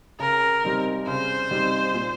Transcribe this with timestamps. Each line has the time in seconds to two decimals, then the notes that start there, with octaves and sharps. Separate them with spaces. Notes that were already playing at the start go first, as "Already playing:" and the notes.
0.20 C#3 A#4
0.64 G3 C4 D#4
1.07 C#3 C5
1.51 G3 C4 D#4
1.94 A#2